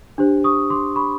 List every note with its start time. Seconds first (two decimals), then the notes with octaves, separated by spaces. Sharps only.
0.18 D4 G4 C5
0.44 C#6 D#6
0.70 C6 D6
0.96 B5 C#6